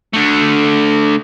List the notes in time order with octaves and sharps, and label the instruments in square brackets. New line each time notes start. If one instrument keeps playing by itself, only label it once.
[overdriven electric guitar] D3 A3